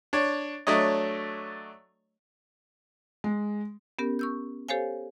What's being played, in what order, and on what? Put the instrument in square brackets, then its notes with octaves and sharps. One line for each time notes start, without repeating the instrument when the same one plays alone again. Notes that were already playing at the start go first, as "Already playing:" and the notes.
[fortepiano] D4 C#5
F#3 A3 D4 C#5 D#5
[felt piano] G#3
[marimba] B3 C#4 G4 A#4
C#6 E6 G6
G4 A4 C5 C#5 F5 G#5